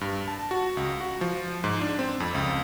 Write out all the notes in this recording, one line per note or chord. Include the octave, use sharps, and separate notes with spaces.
G2
A5
F#4
C#2
F#4
F3
G#2
D4
C4
F2
C#2